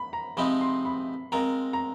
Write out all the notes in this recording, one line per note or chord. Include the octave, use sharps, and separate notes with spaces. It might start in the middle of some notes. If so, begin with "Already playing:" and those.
Already playing: B5
A#5
C3 F3 G#3 C4 D#4 B5
C6
B5
G#3 C4 F4 A#4 A#5
A#5